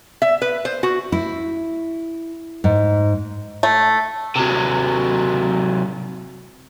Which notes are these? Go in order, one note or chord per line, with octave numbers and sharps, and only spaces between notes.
E5
B4
C5
F#4
E4
G#2
A3
C3 F#3